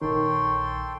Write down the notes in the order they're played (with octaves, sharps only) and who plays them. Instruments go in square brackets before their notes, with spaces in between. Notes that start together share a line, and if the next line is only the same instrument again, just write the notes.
[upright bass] A#1 [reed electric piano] D#3 [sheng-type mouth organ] A4 G5 C6 [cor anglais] C#5